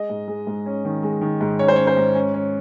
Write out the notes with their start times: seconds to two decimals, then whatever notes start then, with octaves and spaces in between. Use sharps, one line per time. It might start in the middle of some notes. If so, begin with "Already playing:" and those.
Already playing: G#3 D#5
0.10 G#2
0.28 G#3
0.47 G#2
0.66 C#4
0.85 D#3
1.03 G#3
1.21 D#3
1.41 G#2
1.59 C#4 C#5
1.68 C5
1.76 C#4 C#5
1.87 C5
1.97 G#2
2.15 C#4
2.34 C#4